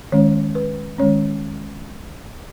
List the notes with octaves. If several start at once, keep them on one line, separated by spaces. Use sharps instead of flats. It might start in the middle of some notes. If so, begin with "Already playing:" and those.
D#3 G#3 C#4 C#5
B4
D#3 G#3 C#4 C#5